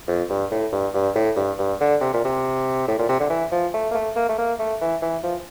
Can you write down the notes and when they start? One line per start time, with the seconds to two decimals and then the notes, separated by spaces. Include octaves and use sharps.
0.08 F2
0.30 G2
0.51 A2
0.73 G2
0.94 G2
1.16 A2
1.36 G2
1.59 G2
1.81 D3
2.01 C3
2.14 A#2
2.25 C3
2.88 A2
2.99 A#2
3.09 C3
3.20 D3
3.30 E3
3.52 F3
3.74 A3
3.91 A#3
3.94 A3
4.16 A#3
4.29 A3
4.38 A#3
4.59 A3
4.81 E3
5.02 E3
5.23 F3